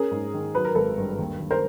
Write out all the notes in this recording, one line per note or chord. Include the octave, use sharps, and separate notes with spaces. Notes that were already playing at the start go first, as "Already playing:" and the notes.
Already playing: C#4 G#4 A#4
G#2
D#3
F#3 B4
A#4
G#1 A4 B4
G2
D#2
D#2
A#4 C5